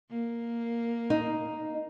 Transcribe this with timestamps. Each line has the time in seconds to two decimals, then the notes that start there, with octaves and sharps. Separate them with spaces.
0.10 A#3
1.10 D#4